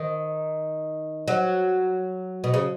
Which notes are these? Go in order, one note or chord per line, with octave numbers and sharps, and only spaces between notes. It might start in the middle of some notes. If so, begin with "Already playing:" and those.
Already playing: D#3
F#3
B2
C#3